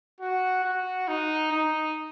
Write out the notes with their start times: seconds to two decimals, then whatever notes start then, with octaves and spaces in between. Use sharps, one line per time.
0.20 F#4
0.64 F#4
1.08 D#4
1.51 D#4